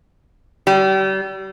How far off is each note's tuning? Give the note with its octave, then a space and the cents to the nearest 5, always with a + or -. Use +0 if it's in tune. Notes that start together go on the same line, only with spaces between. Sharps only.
G3 -35